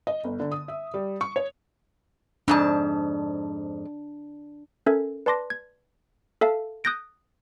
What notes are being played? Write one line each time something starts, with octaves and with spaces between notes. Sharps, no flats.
D#5
G1
D3
D#6
E5
G3
C#6
C#5
F2 G#2 D4 A5
C#4 A4 A#4 E5 G#6
B4 D5 A5 C6 D6 A#6
G#6
A4 E5 F5 A5
D#6 F#6 G6 A6 A#6 D7